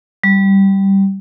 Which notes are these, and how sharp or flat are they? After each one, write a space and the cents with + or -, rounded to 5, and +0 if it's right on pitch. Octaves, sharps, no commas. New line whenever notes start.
G3 -5